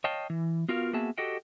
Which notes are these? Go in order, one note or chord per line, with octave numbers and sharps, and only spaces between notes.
C#5 D#5 F5 G5 A5
E3
B3 F4 F#4 A#4 F5
A#3 B3 F#4 G#4 E5 A5
F#4 G4 A4 D#5 F#5 G5